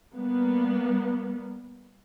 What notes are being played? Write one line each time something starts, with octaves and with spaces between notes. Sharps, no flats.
G3 A#3 B3